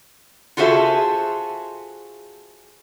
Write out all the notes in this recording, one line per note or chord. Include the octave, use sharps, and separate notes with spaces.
F4 F#4 G#4 A4 C5 E5